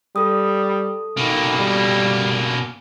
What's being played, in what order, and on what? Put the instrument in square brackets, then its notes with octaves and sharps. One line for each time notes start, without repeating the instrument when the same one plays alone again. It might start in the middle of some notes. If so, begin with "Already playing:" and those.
[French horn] G3 [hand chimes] A4 D#6
[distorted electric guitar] B2 A#3 [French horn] D#3
[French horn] G3